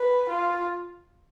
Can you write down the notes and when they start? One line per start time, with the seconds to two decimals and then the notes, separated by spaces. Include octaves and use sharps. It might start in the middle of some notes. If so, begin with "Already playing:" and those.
Already playing: B4
0.30 F4